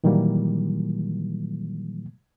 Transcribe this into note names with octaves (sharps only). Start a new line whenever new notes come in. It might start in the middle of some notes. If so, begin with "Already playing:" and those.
A#2 D#3 E3 F#3 G3 A#3